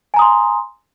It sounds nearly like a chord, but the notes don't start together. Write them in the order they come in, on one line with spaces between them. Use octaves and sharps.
G#5 A#5 D#6 C6